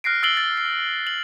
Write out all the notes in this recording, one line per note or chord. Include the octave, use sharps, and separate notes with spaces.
F6 F#6 A#6 C7 D7
E6 A6 C7 D7 F#7 G7
A6
C7
F#7